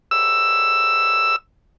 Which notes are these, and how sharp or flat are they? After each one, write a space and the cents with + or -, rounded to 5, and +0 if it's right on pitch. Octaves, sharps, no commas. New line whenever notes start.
E6 +10